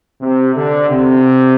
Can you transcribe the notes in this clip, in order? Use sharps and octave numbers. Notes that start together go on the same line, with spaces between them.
C3
D3
C3